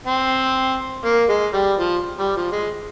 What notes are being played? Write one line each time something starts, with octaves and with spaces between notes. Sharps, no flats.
C4
A#3
G#3
G3
F3
G3
F3
G#3